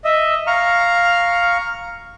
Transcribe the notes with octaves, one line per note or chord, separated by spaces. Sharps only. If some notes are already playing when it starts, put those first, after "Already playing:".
D#5 E5
F5 A#5 C#6 F6